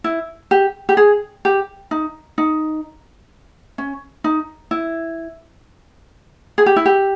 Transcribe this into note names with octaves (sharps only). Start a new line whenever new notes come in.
E4
G4
G4
G#4
G4
D#4
D#4
C#4
D#4
E4
G#4
G4
E4
G4